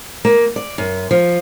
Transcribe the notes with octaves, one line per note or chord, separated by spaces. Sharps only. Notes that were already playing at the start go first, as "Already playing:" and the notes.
A#3
D5
F#2
F3